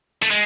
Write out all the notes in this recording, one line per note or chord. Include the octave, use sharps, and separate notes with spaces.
A3
G#3